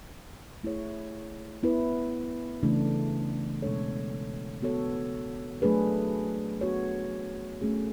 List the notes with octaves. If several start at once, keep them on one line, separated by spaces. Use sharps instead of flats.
A3 E4 G#4 C#5
B3 E4 B4
C#3 E3 A3 D4
B2 G#3 D4 A4 C#5
B3 F#4 A4 C#5
F#3 A3 D4 G#4 B4
B3 F#4 C#5
A3 C#4 G#4